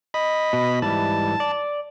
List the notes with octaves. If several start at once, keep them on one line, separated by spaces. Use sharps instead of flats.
D#5 B5
B2
G#2 E3 G3 A5
D5